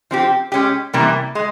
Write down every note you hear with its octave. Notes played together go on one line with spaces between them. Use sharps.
F3 C4 G4
G#3 C#4 G4
C3 E3 G3 A#3
G#3